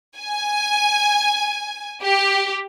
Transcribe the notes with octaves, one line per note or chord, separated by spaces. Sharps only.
G#5
G4